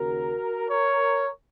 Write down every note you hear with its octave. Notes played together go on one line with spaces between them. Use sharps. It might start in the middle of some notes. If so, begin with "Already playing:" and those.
Already playing: D#2 C#3 F#4 A#4
A#4 C#5